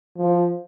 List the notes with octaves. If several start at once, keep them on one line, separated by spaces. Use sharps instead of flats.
F3